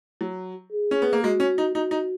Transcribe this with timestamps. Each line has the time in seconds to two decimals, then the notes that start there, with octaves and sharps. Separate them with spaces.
0.21 F#3
0.72 G#4
0.91 C#4
1.02 B3
1.13 A#3
1.23 G#3 F#4
1.40 C#4
1.58 D#4
1.75 D#4 F#4
1.91 D#4